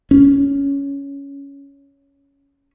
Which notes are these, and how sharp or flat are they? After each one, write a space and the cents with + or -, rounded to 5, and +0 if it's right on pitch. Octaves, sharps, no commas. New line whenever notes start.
C#4 +10